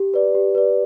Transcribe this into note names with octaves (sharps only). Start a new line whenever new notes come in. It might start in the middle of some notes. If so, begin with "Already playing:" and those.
Already playing: G4
B4 D5
G4
B4 D5